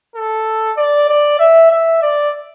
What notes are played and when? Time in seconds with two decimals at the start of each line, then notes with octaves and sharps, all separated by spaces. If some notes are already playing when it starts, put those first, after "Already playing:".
0.16 A4
0.77 D5
1.09 D5
1.40 E5
1.71 E5
2.02 D5